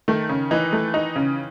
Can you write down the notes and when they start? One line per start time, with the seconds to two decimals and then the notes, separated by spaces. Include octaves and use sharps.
0.08 D#3 A3
0.29 C#3
0.51 E3 D#4
0.73 A3
0.94 D#4
1.16 C#3